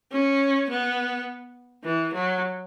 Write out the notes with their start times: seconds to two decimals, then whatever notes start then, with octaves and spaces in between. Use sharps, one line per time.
0.12 C#4
0.70 B3
1.84 E3
2.14 F#3